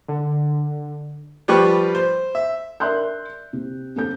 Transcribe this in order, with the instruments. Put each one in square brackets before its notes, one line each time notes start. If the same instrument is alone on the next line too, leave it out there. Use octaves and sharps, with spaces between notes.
[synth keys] D3
[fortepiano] F3 G3 G4 B4 C#6 F#6
C5
E5
[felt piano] A#4 D5 E5 C6 F#6 G6
C3
G1 C4 A4 G6